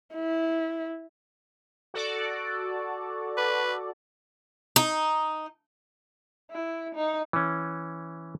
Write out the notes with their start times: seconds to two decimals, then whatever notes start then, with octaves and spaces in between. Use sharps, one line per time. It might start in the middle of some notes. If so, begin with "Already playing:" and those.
0.15 E4
1.94 F#4 A4 D5
3.38 B4
4.76 D#4
6.51 E4
6.95 D#4
7.33 E3 C#4